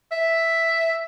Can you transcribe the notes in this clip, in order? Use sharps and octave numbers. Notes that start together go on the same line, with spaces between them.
E5